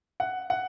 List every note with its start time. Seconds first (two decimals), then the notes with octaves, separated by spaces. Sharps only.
0.20 F#5
0.50 F#5